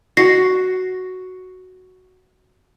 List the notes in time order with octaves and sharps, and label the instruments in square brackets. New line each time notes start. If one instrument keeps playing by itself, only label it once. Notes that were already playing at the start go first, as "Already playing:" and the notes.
[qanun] F#4 [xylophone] A#6 C7